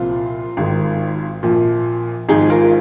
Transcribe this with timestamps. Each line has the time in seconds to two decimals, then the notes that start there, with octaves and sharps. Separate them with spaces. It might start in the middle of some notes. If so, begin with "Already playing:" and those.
Already playing: C2 A#2 F3 C4 F4
0.57 G#1 G#2 D#3
1.43 A#1 A#2 F3
2.29 G#1 G#2 F3 D#4 G#4
2.50 F4 A#4